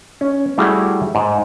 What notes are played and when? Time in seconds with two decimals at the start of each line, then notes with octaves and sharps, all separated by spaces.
0.21 C#4
0.58 G3 A3 E4 F#4 G#4 E5
1.15 G#2